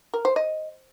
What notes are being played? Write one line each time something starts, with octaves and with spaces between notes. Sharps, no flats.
A#4
C5
D#5